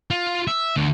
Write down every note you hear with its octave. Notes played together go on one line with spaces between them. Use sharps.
F4
E5
D2